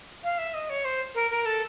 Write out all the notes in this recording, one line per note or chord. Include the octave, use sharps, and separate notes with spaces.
F5
E5
D#5
C#5
C5
A#4
A#4
A4